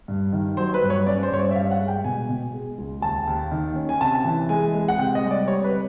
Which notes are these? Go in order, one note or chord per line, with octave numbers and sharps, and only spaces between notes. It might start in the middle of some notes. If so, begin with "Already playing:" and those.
G2
D#3
F#3 C5
B4
G2
C#5
C#4 D5
C5
G2 C#5
D5
E5
G2 F5
F#5
G#3
G5
B2 G#5
B2
G#3
C#2
D#2 A5
D#2
D#3
C#4
G#5
C3 A5
E3
G#3 G#5
G#3
F#5
C3 G5
D#5
G3
D5
G3 C#5
B4
C3